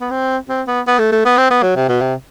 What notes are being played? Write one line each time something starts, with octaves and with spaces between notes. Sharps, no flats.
B3
C4
C4
B3
B3
A3
A3
B3
C4
B3
F#3
C3
B2
C3